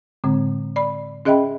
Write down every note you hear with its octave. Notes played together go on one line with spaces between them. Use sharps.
A2 D3 G#3 C4
D5 B5
C#4 G#4 D#5 E5 G5 B5